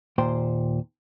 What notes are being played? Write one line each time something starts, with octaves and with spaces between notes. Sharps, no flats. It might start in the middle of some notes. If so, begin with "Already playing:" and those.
D#2 A#2 C5 G5 C6